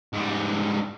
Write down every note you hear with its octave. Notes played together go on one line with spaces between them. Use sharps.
G#2 G3